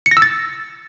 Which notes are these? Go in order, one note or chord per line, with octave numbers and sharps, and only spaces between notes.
C#7
A#6
E6
A6